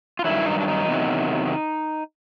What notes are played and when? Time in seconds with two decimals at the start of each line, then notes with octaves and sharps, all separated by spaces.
0.19 F4
0.24 G2 D#3 F#3 E4
0.46 D#4
0.60 D4
0.68 D#4
0.88 E2 C3 D#3 F#3